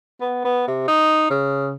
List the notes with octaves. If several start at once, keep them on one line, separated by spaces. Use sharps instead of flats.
B3
B3
C3
D#4
C#3